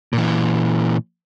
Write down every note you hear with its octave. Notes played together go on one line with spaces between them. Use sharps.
A#2 E3